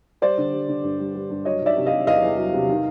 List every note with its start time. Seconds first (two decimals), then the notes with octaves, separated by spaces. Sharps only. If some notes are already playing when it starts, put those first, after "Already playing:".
0.22 G3 C5 D5
0.38 D3
0.53 G3
0.68 D3
0.83 G2
0.99 G3
1.15 G3
1.30 G2
1.45 F#3 C#5 D#5
1.61 D#3 D5 E5
1.76 C3
1.86 D#5 F5
1.92 C3
2.07 E2 D#5 F5
2.23 E2
2.38 F#3
2.54 C3
2.69 D#3